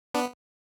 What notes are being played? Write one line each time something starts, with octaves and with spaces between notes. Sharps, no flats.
B3 D4